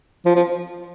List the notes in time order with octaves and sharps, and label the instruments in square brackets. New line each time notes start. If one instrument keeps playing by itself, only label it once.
[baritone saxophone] F3
F3